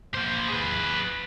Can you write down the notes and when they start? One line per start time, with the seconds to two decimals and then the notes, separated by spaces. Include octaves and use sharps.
0.14 A#3 C5
0.48 G#4 B4